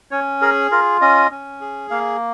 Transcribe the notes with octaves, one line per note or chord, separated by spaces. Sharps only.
C#4 C#5
G#4 A#4
F4 A#4
C#4 D#5
C#4
G#4
A#3 F5